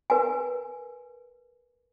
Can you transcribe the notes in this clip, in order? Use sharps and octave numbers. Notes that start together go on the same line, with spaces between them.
A#4 B4 G#5